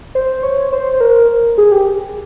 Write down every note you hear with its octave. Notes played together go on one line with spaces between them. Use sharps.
C5
C#5
C5
A#4
G#4
G4